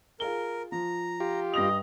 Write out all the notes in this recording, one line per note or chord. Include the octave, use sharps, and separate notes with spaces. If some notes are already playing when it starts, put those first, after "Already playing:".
F4 G#4 A#4 G7
F3 A#5
F4 G4
G2 D#5 A#6 F7